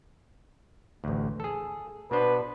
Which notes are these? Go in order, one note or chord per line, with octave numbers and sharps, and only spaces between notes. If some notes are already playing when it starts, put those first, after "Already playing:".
A1 D2
G#4 A4
B2 B3 D4 B4 C5